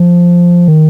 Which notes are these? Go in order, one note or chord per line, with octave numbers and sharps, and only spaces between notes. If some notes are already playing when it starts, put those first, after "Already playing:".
Already playing: F3
D#3